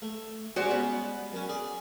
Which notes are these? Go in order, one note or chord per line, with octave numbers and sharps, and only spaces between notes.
A3
G3 G#3 C#4 F#4 C5 D5
B3
F#2 C#4
G#4 D5